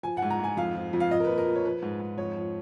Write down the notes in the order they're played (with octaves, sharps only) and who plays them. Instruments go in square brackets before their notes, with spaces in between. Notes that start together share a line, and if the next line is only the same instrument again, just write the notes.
[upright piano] F3 G#5
F#5
G#2
A#5
G#2 G#5
F2 F5
F3
F2
F5
F3 D#5
A#4
B4
A#2
A#4
A#2
C#5
F3 B4
G#2
G#2
F2 C#5
F3